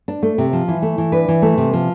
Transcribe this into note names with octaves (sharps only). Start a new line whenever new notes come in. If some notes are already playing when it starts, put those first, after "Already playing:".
D4
A3
C3
F3
E3
A3
E3
D4 B4
E3
A3
C3
F3